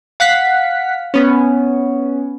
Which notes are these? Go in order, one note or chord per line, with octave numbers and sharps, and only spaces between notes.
F5 F#5 F#6 B6
B3 C#4